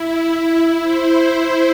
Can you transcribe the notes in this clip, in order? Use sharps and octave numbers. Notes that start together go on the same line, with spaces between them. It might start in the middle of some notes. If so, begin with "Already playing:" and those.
Already playing: E4
C5